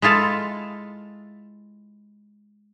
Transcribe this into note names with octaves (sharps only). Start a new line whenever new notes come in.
G#3 E4 F4 A4 F5